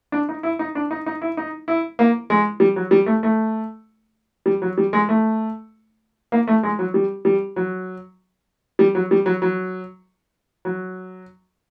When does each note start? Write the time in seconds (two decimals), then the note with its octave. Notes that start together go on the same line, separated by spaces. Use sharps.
0.12 D4
0.29 D#4
0.43 E4
0.59 D#4
0.75 D4
0.91 D#4
1.06 D#4
1.22 E4
1.37 D#4
1.68 E4
1.99 A#3
2.30 G#3
2.60 G3
2.76 F#3
2.91 G3
3.06 A3
3.23 A3
4.46 G3
4.62 F#3
4.78 G3
4.93 G#3
5.09 A3
6.32 A#3
6.47 A3
6.63 G#3
6.79 F#3
6.94 G3
7.25 G3
7.56 F#3
8.79 G3
8.95 F#3
9.11 G3
9.26 F#3
9.42 F#3
10.65 F#3